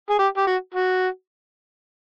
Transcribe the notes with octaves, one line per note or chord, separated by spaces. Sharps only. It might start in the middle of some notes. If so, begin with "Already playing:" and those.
G#4
G4
G4
F#4
F#4